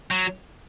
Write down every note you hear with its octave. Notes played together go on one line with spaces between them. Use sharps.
F#3